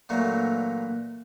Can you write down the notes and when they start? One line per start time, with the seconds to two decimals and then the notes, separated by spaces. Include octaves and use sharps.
0.09 A#2 D3 E3 F#3 A3 A#3